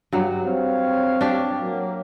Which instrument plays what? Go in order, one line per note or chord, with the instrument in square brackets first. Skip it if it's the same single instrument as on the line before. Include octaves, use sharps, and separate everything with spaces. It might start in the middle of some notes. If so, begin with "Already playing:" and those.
[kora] G2 F#3
[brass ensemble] C4 C#5 F5
[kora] D4 G4
[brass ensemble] F#3 A#3